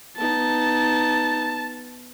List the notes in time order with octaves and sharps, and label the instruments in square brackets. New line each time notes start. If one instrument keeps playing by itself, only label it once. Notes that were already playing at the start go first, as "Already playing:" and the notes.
[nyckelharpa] B3 D#4 [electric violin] A5